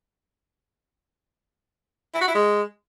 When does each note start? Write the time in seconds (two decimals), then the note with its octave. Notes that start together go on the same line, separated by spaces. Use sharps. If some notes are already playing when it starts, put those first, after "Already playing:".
2.14 E4
2.21 F#4
2.28 E4
2.35 G#3